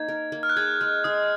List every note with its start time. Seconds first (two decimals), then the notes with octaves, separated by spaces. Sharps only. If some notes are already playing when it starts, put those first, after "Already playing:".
Already playing: A#3 D#4 G#6
0.08 A#4
0.32 A#3
0.43 F6
0.49 F#6
0.56 G#4 G#6
0.81 G#3 F#6
1.04 G#3 D#6